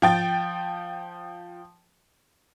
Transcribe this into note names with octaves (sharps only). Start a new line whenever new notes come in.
F3 G5 A6